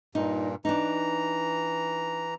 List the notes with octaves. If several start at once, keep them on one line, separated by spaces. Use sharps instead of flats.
G2 A#2 D#4
E3 D4 D#4 A#5